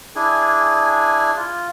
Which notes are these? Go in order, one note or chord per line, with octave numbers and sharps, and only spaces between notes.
D4 E4 G#4 G#5
F4